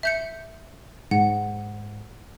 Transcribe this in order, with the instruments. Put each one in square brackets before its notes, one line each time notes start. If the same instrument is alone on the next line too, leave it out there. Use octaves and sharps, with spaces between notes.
[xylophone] E5 G6 C#7
[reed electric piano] G#2 [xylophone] F#5